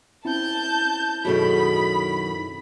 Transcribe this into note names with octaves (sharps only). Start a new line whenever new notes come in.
C4 C#4 E4 A5 G6
F#2 B2 D#3 F#4 G#4 A4 B5